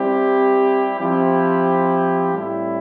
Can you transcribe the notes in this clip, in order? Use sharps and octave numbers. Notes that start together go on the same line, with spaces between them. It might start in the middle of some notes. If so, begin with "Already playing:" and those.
Already playing: G3 C4 E4 G4
F3 C4 E4 G4
A2 G3 C4 E4